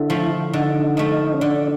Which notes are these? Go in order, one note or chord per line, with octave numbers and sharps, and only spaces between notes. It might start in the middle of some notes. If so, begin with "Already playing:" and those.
Already playing: D3 E4
F3 A3
D3 D#4
F3 A3
C#4
D3 D4